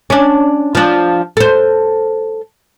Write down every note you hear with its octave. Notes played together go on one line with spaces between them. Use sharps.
C#4 D4
F3 D4
A4 C5